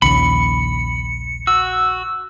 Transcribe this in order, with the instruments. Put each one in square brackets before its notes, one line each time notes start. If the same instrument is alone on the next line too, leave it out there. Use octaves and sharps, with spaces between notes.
[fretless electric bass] A#1 D#2 C#3 [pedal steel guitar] B5 [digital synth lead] C#7
[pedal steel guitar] F#4 [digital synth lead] E6